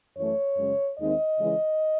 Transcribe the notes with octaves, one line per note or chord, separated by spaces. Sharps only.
F#2 E3 A3 C#5
F#2 C#3 G#3 C#4
D#2 D#3 G#3 C4 D#4 D#5
C#3 E3 G#3 C#4